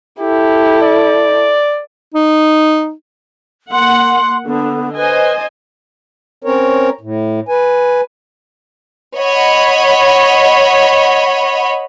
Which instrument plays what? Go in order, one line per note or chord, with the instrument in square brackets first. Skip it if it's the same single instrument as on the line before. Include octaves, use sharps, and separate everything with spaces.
[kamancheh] E4 A4 [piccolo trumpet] G4
[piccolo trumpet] D5
[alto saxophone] D#4
[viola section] A#3 F#5 [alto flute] C6
[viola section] D3 [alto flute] B3
[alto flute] B4 [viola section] C5 D#5 G#5
[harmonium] C4 C#4 A#4 C#5
A2
B4 G#5
[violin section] C#5 D#5 F#5 B5